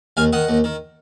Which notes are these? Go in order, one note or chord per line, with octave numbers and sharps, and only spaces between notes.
D#2 F5 G#5
D#3 D#5 F#5
D#2
D#3